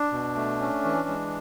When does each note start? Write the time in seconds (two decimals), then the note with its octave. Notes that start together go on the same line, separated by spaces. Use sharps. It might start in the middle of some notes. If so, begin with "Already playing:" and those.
Already playing: D4
0.12 B2
0.36 A3
0.60 C#4
0.84 E3
1.08 G#3